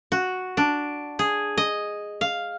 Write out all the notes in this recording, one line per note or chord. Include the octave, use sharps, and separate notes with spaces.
F#4
D4
G#4
D#5
F5